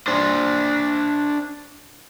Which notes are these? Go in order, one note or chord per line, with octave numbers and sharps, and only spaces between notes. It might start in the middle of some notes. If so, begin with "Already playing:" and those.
D4 C5